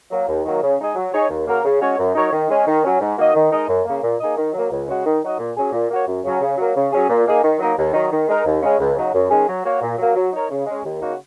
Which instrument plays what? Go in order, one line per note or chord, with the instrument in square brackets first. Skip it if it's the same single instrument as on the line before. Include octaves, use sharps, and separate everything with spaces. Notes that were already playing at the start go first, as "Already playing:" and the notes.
[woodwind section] F#3 A#3
D#2
D#3 F#3 A#3
C#3
G#3 D#4 G#4 D#5
F#3
D#4 G#4 C#5
D#2
C#3 A#3 F#4 A#4
C#3
G#3 C#4 F#4 C#5
F#2
F#3 D#4 A#4 C#5
D#3
G#3 C#4
D#3
F#3 C#4
G#2
D#3 A#3 F#4 D#5
D#3
G#3 D#4 A#4 D#5
F#2
C#3 A#3
A#2
A#3 D#4 G#4 D#5
D#3
F#3 A#3
C#2
C#3 G#3 F#4
D#3
F#3 D#4 F#4 D#5
A#2
F#3 C#4 G#4
A#2
A#3 F#4 C#5
F#2
C#3 F#3 C#4
C#3
F#3 A#3
C#3
F#3 C#4 G#4
A#2
A#3 D#4 G#4
D#3
F#3 A#3 D#4
D#2
D#3 F#3 D#4
D#3
G#3 D#4 A#4
D#2
C#3 G#3 C#4
C#2
C#3 F#3 D#4 F#4
F#2
D#3 G#3 C#4 G#4
F#3
A#3 F#4 C#5
A#2
F#3 A#3
F#3
D#4 A#4 C#5
C#3
G#3 C#4
D#2
C#3 A#3 D#4 F#4